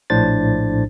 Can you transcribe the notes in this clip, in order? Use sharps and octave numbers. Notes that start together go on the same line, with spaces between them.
A#1 A2 D4 C5 A6